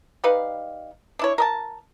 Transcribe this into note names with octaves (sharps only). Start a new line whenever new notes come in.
G3 D#4 B4 F5
D4 E4 C#5
A#4 D#5 A5